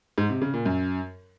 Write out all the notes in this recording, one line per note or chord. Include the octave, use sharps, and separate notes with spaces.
G#2
C3
C#3
A#2
F#2